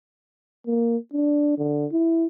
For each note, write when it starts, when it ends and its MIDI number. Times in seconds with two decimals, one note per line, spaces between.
0.67 0.97 58
1.13 1.55 62
1.58 1.86 50
1.92 2.27 64